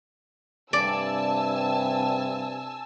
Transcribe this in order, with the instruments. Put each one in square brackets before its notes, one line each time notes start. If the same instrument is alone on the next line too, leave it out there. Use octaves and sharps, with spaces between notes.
[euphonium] G2 [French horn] C3 [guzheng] D5 [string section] G#5 A5 E6